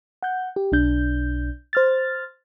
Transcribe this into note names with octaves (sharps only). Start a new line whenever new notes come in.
F#5 G6
G4
B1 D4 G6
C5 F6 A6